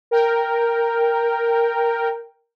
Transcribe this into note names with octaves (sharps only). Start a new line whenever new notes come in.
A#4 G5